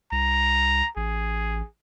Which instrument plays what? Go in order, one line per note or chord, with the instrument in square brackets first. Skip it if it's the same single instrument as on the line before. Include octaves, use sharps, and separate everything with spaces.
[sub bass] C2 [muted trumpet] A#5
[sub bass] A1 [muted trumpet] G#4